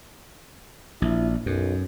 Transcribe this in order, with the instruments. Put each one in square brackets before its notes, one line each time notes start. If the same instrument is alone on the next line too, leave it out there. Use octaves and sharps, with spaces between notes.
[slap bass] A#1 [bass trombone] E4
[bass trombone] B1 [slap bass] F#2